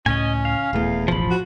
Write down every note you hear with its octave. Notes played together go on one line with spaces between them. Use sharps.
C#2 A2 C#4 D#5 G#5
F5
D#1 E2 A3
E1 A1 F3 B5
F#4